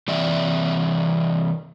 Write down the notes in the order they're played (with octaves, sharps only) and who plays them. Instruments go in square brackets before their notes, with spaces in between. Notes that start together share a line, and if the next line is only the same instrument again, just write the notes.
[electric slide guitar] C3 E3 C4 D5 E5